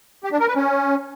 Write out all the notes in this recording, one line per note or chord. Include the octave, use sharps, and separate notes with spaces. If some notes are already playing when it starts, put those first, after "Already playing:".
G4
D4
A#4
B4
C#4